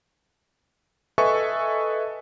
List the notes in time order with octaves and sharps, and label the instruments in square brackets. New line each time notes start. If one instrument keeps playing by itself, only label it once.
[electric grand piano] A4 B4 D#5 E5 G#5 C#6